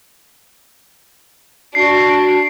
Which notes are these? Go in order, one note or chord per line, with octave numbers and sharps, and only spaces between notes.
D4 F#4 C7